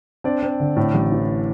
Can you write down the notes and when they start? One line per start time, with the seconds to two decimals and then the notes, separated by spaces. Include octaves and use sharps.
0.24 C4 D4 D5
0.42 C4
0.60 D3
0.77 A2
0.94 A1
1.12 E3